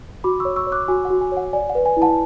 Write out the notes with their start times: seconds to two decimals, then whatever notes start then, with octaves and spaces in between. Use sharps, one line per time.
0.24 F#4 B5 D6
0.40 C#5 C#6 E6
0.56 C#6 E6
0.67 C#5
0.72 D6 F#6
0.88 F#4 G#5
1.05 F#5
1.10 F#4
1.21 G#5
1.32 C#5
1.37 F#5
1.53 D5 G#5
1.70 F#5
1.75 B4
1.86 G#5
1.97 E4
2.02 F#5 A5